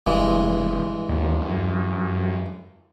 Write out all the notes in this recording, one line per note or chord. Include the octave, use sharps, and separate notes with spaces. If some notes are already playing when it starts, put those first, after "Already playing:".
F1 G2 E3 G#3
D#2
F#2